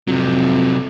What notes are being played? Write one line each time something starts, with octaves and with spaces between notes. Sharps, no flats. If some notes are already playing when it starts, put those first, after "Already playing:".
F2 C3 F#3